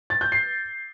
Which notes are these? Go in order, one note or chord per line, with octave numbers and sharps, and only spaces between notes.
A6
G6
C7